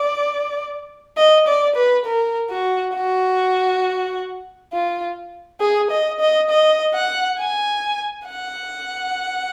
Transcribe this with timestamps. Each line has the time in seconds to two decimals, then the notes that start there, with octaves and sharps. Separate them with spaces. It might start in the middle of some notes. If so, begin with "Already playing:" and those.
Already playing: D5
1.17 D#5
1.47 D5
1.76 B4
2.05 A#4
2.50 F#4
2.94 F#4
4.73 F4
5.60 G#4
5.91 D#5
6.20 D#5
6.50 D#5
6.94 F#5
7.39 G#5
8.27 F#5